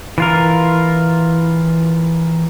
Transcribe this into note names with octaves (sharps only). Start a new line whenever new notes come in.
E3 F4 A#4